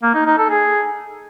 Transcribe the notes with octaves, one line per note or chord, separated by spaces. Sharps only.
A#3
D#4
D#4
A4
G#4